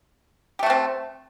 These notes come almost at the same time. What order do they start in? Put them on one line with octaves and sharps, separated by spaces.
G4 A3 F#4 C4